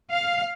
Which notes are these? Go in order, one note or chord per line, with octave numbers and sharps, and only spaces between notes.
F5